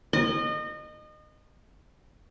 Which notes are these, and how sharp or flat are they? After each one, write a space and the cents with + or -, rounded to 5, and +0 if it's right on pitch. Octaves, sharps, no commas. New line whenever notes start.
D#5 -30